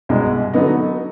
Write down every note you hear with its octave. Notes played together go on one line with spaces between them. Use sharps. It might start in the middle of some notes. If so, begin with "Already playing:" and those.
C2 B2 G#3
D3 F#3 B3 D#4